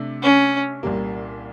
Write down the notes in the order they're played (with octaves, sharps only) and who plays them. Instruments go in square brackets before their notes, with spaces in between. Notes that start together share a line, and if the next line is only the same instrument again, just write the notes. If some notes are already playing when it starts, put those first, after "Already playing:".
Already playing: [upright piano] C3 A3 D4
[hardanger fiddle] C#4
[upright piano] C2 A#2 G3 A#3